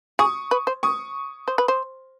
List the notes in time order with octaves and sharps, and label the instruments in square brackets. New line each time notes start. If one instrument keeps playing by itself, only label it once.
[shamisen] G#4 [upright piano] C#6 D#6
[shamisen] B4
C5
[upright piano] C#6 D#6
[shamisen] C5
B4
C5